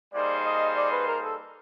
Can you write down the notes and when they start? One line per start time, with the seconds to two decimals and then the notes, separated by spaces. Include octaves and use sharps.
0.14 G3 A#3 D#4 G#4 C5 D5
0.46 D#5
0.77 D5
0.92 B4
1.08 A#4
1.24 A4